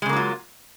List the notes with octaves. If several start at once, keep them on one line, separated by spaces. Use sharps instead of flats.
C#3 F#3 G#3 A#3 F4